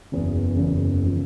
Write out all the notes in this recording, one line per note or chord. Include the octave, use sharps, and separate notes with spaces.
F#1 E2 C#3
F#1 E2 C#3
C#3 F3